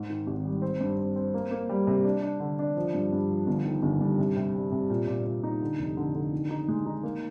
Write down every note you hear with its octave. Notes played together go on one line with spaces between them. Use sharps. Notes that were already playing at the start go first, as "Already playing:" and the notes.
Already playing: G#2
D#3
G#1
G3
C4
G2
C4
C4
A#3
A#3
G3
C3
D4
D4
D3
D4
F3
G2
G2
F3
G1
D#3
G1
G2
C3
C3
G3
C3
A#2
A#2
A#2
D#4
D3
F1
D3
D3
D#3
D#4
G#3
D#4
A#3